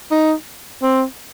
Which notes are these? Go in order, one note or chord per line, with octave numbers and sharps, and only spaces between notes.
D#4
C4